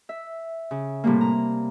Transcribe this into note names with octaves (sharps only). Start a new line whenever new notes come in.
E5
C#3
A2 C3 G3 A#3
A#5